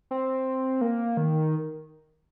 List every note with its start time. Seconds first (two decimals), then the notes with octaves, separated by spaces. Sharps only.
0.11 C4
0.81 A#3
1.17 D#3